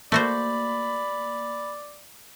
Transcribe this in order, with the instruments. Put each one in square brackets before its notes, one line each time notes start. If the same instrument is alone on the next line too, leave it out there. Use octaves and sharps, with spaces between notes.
[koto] A3 F#4 C5 [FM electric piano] A#3 [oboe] D5 [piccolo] B5